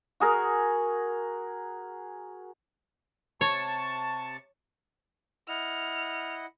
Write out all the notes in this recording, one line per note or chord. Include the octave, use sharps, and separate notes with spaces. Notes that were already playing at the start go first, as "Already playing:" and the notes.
F#4 G#4 A#4
C3 C#5 A5 C#6
E4 D#5 F#5 F6